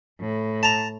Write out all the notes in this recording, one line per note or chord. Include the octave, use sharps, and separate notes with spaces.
A2
A5 A#5